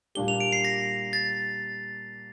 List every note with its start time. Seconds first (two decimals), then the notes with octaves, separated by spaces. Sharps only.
0.15 A#2 G3 A#3 D4 G4 G7
0.28 F7
0.40 D7
0.52 C7
0.64 A#6
1.13 A6